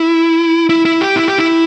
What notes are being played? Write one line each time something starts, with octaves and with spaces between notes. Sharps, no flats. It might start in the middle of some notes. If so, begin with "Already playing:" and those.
Already playing: E4
E4
E4
G4
E4
G4
E4